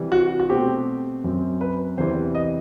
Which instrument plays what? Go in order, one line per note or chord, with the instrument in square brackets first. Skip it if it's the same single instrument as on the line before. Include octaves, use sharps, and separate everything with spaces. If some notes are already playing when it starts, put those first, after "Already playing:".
Already playing: [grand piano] C3 E3 G3
F#4
F#4
B2 A3 C4 G4
F#2 F#3 C4
B4
E2 C3 E3 G3 C5
D#5